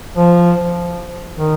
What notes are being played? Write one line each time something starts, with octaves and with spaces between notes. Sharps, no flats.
F3
D#3